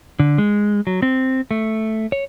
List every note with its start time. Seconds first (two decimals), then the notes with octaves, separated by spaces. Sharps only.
0.19 D3
0.38 G#3
0.87 F#3
1.02 C4
1.51 A3
2.12 C#5